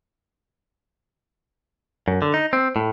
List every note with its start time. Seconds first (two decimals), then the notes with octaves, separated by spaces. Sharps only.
2.08 F#2
2.22 D3
2.34 D#4
2.53 C4
2.76 A2